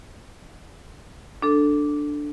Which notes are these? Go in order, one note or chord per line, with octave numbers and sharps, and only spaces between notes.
D4 A4